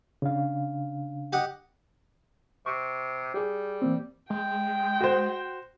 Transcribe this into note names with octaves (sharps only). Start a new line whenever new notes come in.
C#3 D4 F5
G4 D#5 F#5
C3 C#6
G3 G4 G#4
E3 A#3 C4
G#3 G5
F#4 C5